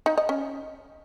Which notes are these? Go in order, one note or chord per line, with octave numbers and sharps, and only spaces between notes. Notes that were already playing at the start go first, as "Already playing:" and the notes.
D#4
D#5
C#4